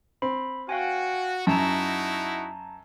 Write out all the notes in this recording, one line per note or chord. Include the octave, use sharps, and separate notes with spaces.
C4 B5
F#4 F5 G5 G#5
F#2 D#4 E4 F#4 A5 A#5